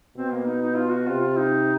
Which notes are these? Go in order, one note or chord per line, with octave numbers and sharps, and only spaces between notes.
B2 C4
A#3
D#4
D#4
F4
F#4
C3 F4
F4
D#4